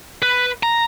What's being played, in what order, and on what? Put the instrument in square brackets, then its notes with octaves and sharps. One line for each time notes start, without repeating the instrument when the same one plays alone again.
[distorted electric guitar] B4
A#5